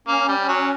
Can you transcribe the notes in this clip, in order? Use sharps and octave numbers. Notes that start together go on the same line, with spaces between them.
A#3 C#4
G3
C#4
F#3